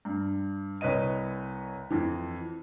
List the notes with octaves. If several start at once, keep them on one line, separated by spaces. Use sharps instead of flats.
G2
C2 B4 C#5 D#5 D#7
F2 E3